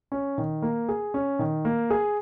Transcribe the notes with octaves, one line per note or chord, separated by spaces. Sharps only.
C#4
D#3
A#3
G#4
C#4
D#3
A#3
G#4